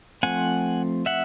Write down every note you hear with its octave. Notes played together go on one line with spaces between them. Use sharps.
F3 A3 C4 F#5 G#5
E5 F#5